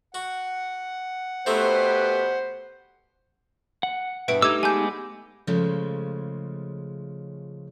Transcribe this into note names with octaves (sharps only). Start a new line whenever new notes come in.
F#4 F#5
B2 A3 C4 D#4 G4 B4 C5
F#5
G2 B2 E4 B4 D7
G3 A3 D#4 D6 E6 G#6
G#3 B3 G#5 A5 D6 G6
C#3 F3 G#3 A3